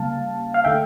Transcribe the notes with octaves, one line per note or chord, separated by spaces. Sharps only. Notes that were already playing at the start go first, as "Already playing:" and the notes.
Already playing: C#3 G3 A#3 F5 A5
F5
D3 A3 E5 G5